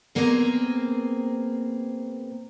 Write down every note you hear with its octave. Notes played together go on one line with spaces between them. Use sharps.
B2 A#3 C4 G#4 D5 A#5